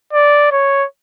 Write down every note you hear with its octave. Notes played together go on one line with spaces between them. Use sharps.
D5
C#5